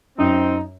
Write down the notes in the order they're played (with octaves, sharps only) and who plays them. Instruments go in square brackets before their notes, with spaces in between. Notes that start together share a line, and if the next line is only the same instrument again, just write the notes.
[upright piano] F#2 [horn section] C4 D#4